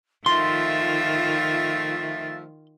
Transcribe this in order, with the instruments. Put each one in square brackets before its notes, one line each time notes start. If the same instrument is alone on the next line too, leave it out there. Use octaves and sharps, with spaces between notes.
[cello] D#3 F4 [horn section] F3 A3 E5 [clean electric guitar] C6 [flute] A6